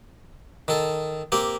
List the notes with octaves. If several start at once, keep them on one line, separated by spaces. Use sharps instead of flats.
D#3 A4
A#3 C4 G4